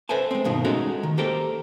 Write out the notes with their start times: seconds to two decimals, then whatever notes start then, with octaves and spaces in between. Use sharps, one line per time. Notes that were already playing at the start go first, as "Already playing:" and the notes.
0.09 A4 B4 C5 E5 G#5 A5
0.31 G#3 C4
0.44 G2 B2 D#3
0.65 G#3 A3 C#4 D#4 F#4 A4
1.03 D#3
1.17 A#3 G4 A4 A#4 C5 G5